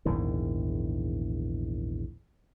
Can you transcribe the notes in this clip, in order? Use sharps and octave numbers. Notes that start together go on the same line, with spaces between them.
A#1 E2 G#2 D#3